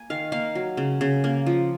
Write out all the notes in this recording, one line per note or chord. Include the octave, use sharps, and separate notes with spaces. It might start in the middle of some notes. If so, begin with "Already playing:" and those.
Already playing: A#3 G#5
D#3 F5
A#3 F5
F#3
C#3
C#3
A#3
F3